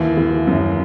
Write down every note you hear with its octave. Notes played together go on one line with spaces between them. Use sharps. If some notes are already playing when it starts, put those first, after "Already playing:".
Already playing: D#2 E3
E3
F#2